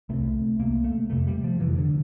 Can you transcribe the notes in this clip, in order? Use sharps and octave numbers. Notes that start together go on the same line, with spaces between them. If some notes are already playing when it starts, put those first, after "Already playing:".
C2 C3 A3
C2 C3 A#3
A3
F2 C3 A3
G3
F3
F2 C3 E3
D3